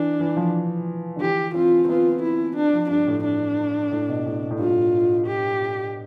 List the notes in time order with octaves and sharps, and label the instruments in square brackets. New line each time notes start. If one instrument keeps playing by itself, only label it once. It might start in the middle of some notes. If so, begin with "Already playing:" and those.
Already playing: [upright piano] E3 [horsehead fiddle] D4
[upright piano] E3
F3
D3
[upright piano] E3 [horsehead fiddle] G4
[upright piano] C4 [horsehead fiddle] F4
[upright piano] C4
[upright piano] B3 [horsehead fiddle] F4
[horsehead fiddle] E4
D4
[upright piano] F3
[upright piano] G2 [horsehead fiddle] D4
[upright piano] A2
[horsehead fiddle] D4
[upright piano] A2
B2
A2
B2
A2
[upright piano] G2 [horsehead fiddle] F4
[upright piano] A2
[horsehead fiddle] G4